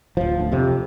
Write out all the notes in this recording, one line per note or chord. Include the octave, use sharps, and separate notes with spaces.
D1 F3
D2
F2 C3